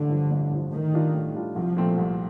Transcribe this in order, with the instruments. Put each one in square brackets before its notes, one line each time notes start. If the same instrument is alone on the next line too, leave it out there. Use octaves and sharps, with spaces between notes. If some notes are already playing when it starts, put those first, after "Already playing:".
Already playing: [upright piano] A1 [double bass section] D3
[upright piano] G2 F3
A1
G2 F3
[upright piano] A2 [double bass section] D#3
[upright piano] G3 D4 F4
A2
G3 D4 F4
[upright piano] C2 [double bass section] F3
[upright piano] A#2 A3 C4
C2